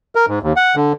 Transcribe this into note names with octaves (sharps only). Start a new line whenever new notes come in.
A#4
G#2
D#2
F#5
D3